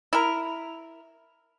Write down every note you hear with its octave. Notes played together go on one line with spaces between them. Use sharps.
E4 A#4